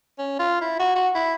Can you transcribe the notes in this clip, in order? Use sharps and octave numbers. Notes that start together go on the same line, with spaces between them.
C#4
F4
E4
F#4
F#4
E4